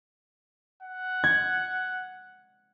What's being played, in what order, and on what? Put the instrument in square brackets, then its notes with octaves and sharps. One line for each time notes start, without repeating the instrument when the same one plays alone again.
[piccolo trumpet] F#5
[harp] G#6